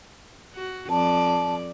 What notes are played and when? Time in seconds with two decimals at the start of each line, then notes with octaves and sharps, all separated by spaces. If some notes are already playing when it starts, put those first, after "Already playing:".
0.55 F#4
0.90 F2 D5 A5